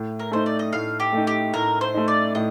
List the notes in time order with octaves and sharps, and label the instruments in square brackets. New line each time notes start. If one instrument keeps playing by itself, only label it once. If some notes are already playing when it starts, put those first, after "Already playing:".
Already playing: [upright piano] A2
[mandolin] A#4
[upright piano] A3 D#4 [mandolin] C5
[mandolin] D5
D#5
[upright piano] A2 [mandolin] F5
[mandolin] G4
[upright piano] A3 D#4
[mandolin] G4
[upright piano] A2 [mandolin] A#4
[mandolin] C5
[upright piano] A3 D#4
[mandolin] D5
[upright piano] A2 [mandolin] D#5